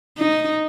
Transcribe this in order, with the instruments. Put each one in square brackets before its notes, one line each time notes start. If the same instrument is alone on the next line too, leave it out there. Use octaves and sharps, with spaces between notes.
[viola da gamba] D#4